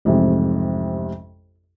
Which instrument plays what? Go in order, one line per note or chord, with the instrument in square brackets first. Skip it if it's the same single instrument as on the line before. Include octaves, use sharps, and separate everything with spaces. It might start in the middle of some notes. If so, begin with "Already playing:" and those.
[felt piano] A1 F2 G#2 C3